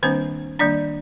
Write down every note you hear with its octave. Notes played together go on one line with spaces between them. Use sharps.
D#3 G3 A#3 C4 D4 C5
D#3 G3 A#3 D4 D5